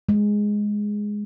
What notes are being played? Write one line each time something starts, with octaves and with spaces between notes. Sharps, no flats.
G#3